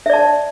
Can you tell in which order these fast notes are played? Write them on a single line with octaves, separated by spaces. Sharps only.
E5 D5 A5